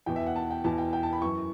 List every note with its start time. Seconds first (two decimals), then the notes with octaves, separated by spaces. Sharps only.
0.06 E2 B2 G5
0.16 E5
0.26 F#5
0.36 A5
0.50 G5
0.64 E2 B2 A5
0.78 G5
0.93 G5
1.03 A5
1.13 B5
1.21 F#2 E3 C#6